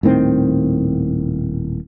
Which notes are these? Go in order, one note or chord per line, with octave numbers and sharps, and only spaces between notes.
D#1 A2 D#3 C4